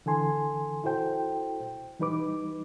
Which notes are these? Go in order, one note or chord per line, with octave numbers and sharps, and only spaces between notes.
D3 E3 A4 G#5 C6
E4 F#4 A4 C5 G5
E3 G3 D#4 B4 D6